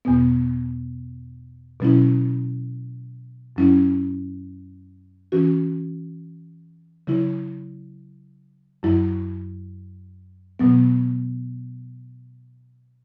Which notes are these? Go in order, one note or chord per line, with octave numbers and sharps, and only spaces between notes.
E2 B2 B3
B2 F#3 C#4 E4
F#2 F#3 C#4 E4
E3 C#4 F#4
C#3 F#3 E4
F#2 F#3 E4
B2 F#3 B3